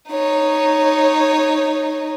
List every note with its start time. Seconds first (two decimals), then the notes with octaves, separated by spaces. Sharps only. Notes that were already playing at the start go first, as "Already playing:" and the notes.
0.10 D#4 C#5